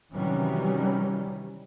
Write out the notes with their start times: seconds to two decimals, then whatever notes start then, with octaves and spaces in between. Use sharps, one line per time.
0.15 C3 D#3 E3 F#3 G3 C#4